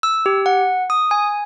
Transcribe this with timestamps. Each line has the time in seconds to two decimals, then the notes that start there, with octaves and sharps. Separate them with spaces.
0.03 E6
0.26 G4
0.46 F#5
0.90 D#6
1.11 G#5